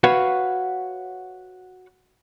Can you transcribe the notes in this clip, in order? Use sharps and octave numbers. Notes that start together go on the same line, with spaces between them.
F#4 B4 C#5 F5 F#5